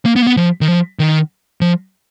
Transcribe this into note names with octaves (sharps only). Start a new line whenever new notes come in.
A#3
B3
A#3
B3
F3
D#3
F3
D#3
F3